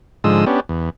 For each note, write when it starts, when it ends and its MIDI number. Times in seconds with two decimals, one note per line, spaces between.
0.24 0.45 44
0.24 0.45 50
0.24 0.45 53
0.24 0.45 56
0.24 0.45 87
0.24 0.45 88
0.46 0.60 59
0.46 0.60 61
0.46 0.60 62
0.46 0.60 67
0.69 0.90 40